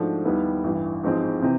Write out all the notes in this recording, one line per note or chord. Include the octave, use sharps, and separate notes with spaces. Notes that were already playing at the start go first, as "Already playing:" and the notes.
Already playing: G#2 F3 A3 D4 F#4
D#2 D#3 G3 B3 E4
A1 G2 E3
A1 G#2 F3 G#3 C4
C3 E3 C4